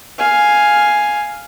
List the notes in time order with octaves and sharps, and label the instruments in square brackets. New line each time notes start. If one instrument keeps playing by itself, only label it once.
[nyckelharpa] F5 G#5